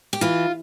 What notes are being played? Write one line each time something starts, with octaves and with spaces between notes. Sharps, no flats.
G4
E3 F4